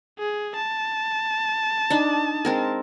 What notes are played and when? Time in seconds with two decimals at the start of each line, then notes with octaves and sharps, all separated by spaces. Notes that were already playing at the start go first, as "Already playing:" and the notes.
0.19 G#4
0.56 A5
1.90 D4 D#4 D5
2.45 G#3 C4 A#4